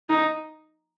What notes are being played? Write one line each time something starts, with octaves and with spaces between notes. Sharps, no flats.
D#4